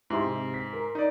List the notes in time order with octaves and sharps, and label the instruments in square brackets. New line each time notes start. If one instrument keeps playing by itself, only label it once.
[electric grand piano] G#2 [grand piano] E4 G4 C6
[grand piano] C3
B6
A#4
[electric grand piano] D#4 D5